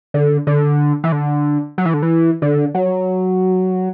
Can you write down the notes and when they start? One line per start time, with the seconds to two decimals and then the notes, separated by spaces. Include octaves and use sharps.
0.14 D3
0.47 D3
1.04 E3
1.12 D3
1.78 F#3
1.85 E3
1.94 D3
2.03 E3
2.42 D3
2.75 F#3